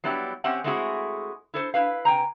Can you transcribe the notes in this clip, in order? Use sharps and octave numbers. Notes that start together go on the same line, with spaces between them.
F#3 G3 B3 E4 G4
C4 C#4 G4 E5 F#5 G#5
G#3 A3 C4 E4 F#4 G#4
E4 A4 C5
E4 B4 F5
C3 G5 G#5 A#5